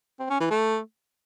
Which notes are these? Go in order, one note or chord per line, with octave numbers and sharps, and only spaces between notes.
C4
C#4
E3
A3